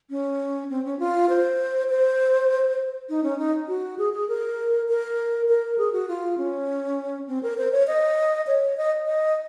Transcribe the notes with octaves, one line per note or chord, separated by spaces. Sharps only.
C#4
C4
C#4
F4
C5
C5
D#4
C#4
D#4
F#4
G#4
G#4
A#4
A#4
A#4
G#4
F#4
F4
C#4
C4
A#4
C5
C#5
D#5
C#5
D#5
D#5